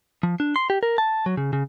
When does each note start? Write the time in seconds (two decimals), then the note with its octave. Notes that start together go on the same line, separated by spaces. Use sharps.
0.23 F3
0.40 D4
0.56 C6
0.70 G4
0.83 A#4
0.98 A5
1.26 F#3
1.37 C#3
1.53 C#3